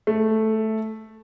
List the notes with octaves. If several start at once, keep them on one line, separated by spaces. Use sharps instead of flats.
A3